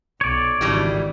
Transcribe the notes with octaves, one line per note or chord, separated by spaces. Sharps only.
B1 C#5 D5
G#1 C#3 E3 G3